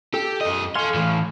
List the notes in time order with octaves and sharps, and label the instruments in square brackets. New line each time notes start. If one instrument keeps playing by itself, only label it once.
[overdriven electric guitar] G4 [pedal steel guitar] A4
[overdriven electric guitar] F#2 D#5
[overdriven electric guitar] A4 C6 [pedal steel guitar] F5 G#5 C#6
[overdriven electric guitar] A2 E3